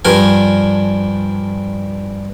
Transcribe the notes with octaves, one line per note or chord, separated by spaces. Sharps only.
G2 F3 D4 A#4 G#5